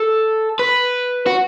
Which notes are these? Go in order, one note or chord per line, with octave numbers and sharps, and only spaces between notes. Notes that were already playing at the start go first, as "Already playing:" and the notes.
Already playing: A4
B4
F#4